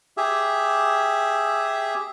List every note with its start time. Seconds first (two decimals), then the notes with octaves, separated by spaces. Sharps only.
0.17 G4 G#4 E5